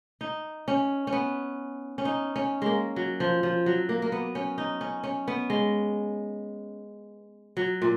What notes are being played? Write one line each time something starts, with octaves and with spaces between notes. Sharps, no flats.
D#4
C#4
C#4
B3
C#4
D#4
C#4
G#3 A#3
F#3
F3
F3
F#3
A#3
A#3
B3
C#4
D#4
C#4
C#4
B3
G#3
F#3
A#2